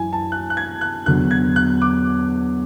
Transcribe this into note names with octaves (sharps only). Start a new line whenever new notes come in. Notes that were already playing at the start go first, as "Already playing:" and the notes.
Already playing: F#2 E3 G#5
A5
F#6
F#6
G#6
F#6
E2 D3 F#3 F#6
G#6
F#6
D6